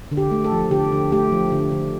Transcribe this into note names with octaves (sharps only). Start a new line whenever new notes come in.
D3
G4
A3
A4
F3
D3 G4
D3
A3 G4
F3
D3
D3